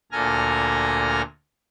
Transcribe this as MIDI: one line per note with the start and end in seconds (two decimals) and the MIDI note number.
0.12 1.22 38
0.12 1.22 46
0.12 1.22 69
0.12 1.22 80
0.12 1.22 82
0.12 1.22 89